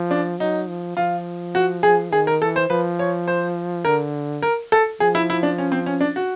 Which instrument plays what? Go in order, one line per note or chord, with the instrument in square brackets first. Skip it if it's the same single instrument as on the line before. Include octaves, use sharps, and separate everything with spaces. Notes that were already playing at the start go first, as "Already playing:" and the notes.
Already playing: [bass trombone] F3
[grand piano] D4
[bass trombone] F#3 [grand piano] D#4
[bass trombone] F3
[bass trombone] F3 [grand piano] F4
[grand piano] F#4
G#4
[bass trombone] D#3 [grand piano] G#4
[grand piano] A#4
[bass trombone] E3 [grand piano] A4
[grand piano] C5
[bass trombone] F3 [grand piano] B4
[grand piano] C#5
C5
[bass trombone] D3 [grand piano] A#4
[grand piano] A#4
A4
[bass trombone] F3 [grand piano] G#4
[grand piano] E4
E4
D4
C#4
C4
C#4
D4
F#4